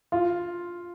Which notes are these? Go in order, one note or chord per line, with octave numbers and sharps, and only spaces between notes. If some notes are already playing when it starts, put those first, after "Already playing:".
F4